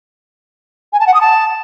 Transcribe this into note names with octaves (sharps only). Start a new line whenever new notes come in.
G#5
A5
F#5
D#6
A5